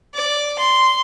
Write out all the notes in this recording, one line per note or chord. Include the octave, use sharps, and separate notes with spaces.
D5
C6